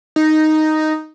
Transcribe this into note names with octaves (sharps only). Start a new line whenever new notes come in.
D#4